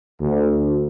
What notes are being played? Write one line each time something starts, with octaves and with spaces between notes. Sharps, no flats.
D2